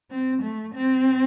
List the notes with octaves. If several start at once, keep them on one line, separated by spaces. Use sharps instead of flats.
C4
A3
C4